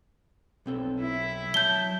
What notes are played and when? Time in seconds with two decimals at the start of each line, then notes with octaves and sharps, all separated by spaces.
0.66 B1 C4 A4
1.00 E4 E5
1.54 F#3 A5 G6 G7